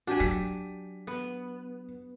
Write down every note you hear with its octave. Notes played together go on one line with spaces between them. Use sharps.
D4 F#4 G4 G#5
F#3 B6
B3